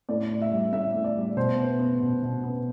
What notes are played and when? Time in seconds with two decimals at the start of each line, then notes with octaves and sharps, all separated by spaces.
0.09 A2 D5
0.31 A2
0.42 E5
0.52 G3
0.73 A2 E5
0.94 A2
1.04 D5
1.15 G3
1.37 B2 C5
1.58 B3
1.79 B3
2.00 B2
2.22 B2
2.44 B3